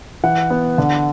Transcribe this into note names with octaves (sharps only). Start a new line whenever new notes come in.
E3 F#5
B3
D3